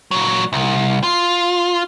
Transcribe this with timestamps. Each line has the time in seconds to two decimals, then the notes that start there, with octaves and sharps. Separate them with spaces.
0.11 A#2 F#3
0.53 C2
1.03 F4